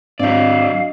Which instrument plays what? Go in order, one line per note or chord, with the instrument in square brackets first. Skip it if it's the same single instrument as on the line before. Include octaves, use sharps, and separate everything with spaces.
[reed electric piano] G#2 C4 [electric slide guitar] F#3 D5 [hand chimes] D4 D#5 [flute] F5